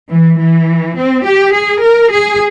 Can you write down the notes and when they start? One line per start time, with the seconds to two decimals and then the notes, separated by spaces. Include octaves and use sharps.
0.09 E3
0.38 E3
0.95 C4
1.24 G4
1.52 G#4
1.81 A#4
2.10 G#4